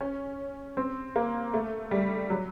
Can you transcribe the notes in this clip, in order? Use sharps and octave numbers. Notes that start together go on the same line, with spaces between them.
C#4
C4
A#3
A3
G3
F#3